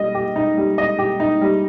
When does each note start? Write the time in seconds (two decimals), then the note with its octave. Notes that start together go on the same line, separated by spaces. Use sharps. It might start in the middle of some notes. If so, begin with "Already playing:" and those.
Already playing: G3 D#5
0.15 G4
0.36 D#4
0.57 G3
0.78 D#5
0.99 G4
1.20 D#4
1.41 G3